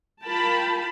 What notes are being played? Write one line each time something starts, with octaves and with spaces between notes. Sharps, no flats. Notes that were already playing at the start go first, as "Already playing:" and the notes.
F4 A#4 G5 A5 B5